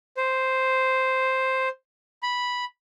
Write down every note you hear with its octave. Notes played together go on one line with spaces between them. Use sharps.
C5
B5